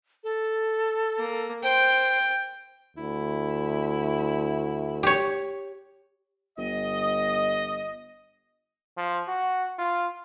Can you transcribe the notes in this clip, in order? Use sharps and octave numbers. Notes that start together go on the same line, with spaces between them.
A4
A#3
C5 G5
D2 E4
G4 C#5
G1 D#5
F3
F#4
F4